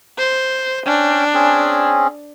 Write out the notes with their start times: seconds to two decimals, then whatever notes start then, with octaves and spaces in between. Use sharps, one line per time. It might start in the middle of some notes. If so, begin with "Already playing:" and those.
0.18 C5
0.86 C#4 D4 G5
1.34 C4 C#4 G#4